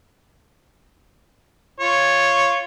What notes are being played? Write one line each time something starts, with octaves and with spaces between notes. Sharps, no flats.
F4 C#5